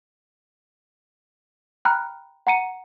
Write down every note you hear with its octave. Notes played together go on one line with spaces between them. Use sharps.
G5 A#5 B5 F6 F#6
F#5 A#5 C#7 D#7